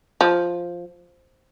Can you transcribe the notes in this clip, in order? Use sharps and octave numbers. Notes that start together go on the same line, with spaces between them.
F3